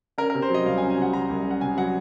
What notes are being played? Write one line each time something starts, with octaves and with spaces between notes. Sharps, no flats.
C#4 A#4
A#4
C3
C5
F#3 D#5
C2 F5
G#5
C#4
G#5
C3 F#5
F#3 A#5
C2
C#4
F#5
C3 G#5
F#3 F#5